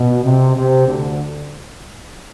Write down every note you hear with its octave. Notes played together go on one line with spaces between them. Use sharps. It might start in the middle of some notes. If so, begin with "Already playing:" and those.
Already playing: B2
C3
C3
D2 D3